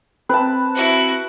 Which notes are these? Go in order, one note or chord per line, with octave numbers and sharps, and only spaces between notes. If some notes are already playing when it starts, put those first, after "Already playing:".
C4 B4 A5
E4 F#4